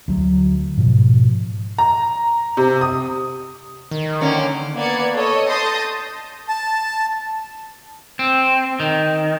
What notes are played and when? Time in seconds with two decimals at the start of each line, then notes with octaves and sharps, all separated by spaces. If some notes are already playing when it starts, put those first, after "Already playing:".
0.08 D2 F#3
0.77 G#2 B2 F3
1.78 A#5
2.57 C3
2.81 D#6
3.91 D#3
4.21 D3 A#3 C#4
4.76 A#3 B3 D5 G#6 C#7
5.15 A4 C#5 D#5
5.47 A5 C6 D#6 G6 A6 A#6
6.49 A5
8.19 C4
8.80 D#3